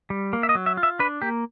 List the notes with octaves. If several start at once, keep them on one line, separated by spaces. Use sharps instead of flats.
G3
A#3
E5
D#5
F#3
E5
F4
E5
D4 B4
A#3 G4